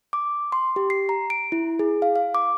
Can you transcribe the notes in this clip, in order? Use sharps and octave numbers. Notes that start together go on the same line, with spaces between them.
D6
C6
G4
C7
A#5
D7
E4
G#4
F5
F5
D6